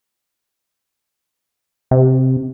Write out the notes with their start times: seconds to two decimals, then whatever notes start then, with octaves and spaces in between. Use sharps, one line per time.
1.91 C3